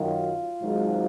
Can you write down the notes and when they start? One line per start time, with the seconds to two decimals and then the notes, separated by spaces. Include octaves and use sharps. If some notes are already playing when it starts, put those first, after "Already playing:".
Already playing: F#2 D#3 F#3 F4
0.61 G#1 G#2 F#3